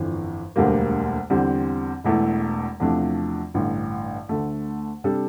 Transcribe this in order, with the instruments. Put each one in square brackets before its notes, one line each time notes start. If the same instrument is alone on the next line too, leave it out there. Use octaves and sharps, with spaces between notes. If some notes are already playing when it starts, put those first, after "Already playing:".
Already playing: [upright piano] G1 F2 E3
E1 D2 D3 G3 A#3
E2 D3 G3 C4
E1 E2 E3 A3
E2 C3 F3 A3 D4
A1 G2 D3
D2 D3 A3
C3 G3 D4 A4